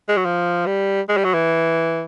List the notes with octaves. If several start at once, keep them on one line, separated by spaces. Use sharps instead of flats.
G#3
F#3
F3
G3
G#3
G3
F#3
E3